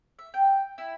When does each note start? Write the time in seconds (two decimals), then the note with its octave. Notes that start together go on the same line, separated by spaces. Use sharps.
0.19 E5
0.34 G5
0.78 E4